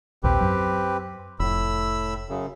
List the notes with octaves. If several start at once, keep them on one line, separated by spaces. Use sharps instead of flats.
A#1 D#2 A#2 C4 G4 B4
F#2 F#3
F1 A2 B5 E6
F#2 C#3